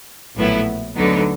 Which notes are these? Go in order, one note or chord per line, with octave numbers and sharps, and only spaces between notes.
A#1 A2 F#3 B3 E4
D2 D3 F#3 B3 D#4